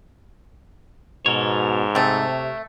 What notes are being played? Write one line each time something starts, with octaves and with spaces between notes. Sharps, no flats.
G#2 B2 A4 A#4 C#5
C3 A3 C4